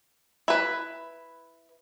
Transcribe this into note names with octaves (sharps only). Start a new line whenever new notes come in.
E4 B4